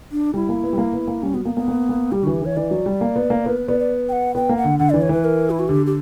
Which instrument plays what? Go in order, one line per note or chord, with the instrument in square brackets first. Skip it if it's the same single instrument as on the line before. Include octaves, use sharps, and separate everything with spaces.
[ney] D4
[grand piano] G3 [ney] E4
[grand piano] A#3
B3
G3
A#3
B3
A#3
[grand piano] G3 [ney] C#4
[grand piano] F#3 [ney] B3
[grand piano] A#3 [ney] B3
[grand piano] A#3 [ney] B3
[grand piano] A#3
A#3
[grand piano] G3 [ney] G4
[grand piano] D3 E3 [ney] F#4
[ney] G4
[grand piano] E3 [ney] C#5
[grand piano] E3 [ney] D5
[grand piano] F#3
G3
A#3
B3
A#3
[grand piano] B3 [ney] A#4
[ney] B4
[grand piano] B3 [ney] D5
[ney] D5
G5
F#5
[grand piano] B3 [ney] G5
[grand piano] A#3
[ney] F#5
[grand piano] D3
[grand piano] D3 [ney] F#5
[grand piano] E3 [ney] D5
[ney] C#5
[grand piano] E3 [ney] B4
[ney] A#4
E4
F#4
[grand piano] D3 [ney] G4
[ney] G4